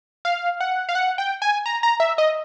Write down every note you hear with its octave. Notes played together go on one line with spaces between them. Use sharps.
F5
F#5
F5
F#5
G5
G#5
A#5
A#5
E5
D#5